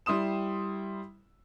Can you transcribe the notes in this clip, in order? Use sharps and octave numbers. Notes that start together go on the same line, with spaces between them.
G3 E4 C6 D#6 E7